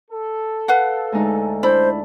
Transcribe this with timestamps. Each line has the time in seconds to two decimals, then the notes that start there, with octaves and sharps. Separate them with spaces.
0.11 A4
0.68 B4 F5 F#5
1.12 D2 G#3 D#4
1.63 D4 E4 C5 B5